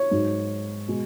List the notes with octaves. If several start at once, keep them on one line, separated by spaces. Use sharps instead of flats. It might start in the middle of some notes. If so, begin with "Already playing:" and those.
Already playing: C#5
G#2 F#3
B2 G#3